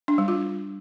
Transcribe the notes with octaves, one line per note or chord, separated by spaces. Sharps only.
D4
G3
F4